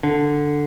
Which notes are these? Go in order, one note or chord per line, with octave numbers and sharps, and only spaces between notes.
D3